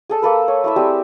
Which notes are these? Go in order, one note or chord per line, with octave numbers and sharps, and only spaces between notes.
G#4 A4 A5
A#3 A4 B4
C#5
A3 E4 E5
G3 C4 G4 G#4